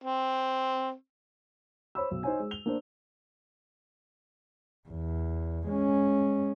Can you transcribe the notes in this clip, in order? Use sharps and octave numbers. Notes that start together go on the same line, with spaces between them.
C4
C5 C#5 B5 E6
B1
D#4 C5 C#5 G#5
G#3
F7 G7
A#3 D4 C5
E2
G#3 C#4